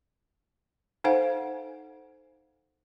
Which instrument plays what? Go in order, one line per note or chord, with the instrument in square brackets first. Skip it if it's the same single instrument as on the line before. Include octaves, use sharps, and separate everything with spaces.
[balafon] D#4 A4 C5 F5 F#5 G#5